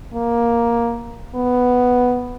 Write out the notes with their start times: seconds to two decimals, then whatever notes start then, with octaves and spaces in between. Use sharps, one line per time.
0.14 A#3
1.35 B3